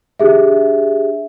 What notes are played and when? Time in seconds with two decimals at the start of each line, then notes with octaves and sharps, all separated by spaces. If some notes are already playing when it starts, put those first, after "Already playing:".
0.20 D4 G4 G#4 E5